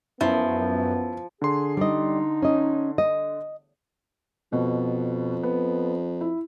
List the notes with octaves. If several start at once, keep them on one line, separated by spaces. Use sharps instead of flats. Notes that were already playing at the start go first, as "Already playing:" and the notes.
F#2 F3 B3 E4
D3 G#4 C6
G3 D#4 D#5
C#4 D#5
D#5
F2 B2
B3
E4